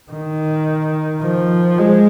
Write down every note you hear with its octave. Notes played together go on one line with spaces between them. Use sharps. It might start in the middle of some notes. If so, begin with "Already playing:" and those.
D#3
F3
G#3